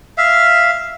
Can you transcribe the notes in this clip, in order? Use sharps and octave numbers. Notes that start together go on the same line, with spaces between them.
E5 F5